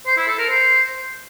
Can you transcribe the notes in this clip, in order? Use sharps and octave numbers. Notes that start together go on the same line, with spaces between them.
C5
E4
A4
A#4
C5